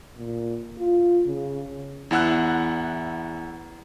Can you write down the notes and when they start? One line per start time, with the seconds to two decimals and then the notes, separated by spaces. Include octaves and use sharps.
0.17 A#2
0.79 F4
1.26 C#3
2.11 E2 E4 F#5 E6 F#6